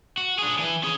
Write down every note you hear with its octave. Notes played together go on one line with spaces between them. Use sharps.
F#4
D4 G#4
E3 G#5
C#4 G#4